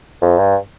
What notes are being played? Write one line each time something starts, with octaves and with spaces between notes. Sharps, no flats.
F2
G2